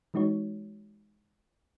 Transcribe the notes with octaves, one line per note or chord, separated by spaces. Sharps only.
E3 G#3 D#4 F#4 C#5